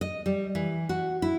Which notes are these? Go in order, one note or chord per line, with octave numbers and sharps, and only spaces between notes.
D#5
G3
E3
F#4
E4